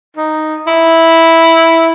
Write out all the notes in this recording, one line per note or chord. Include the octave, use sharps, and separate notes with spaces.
D#4
E4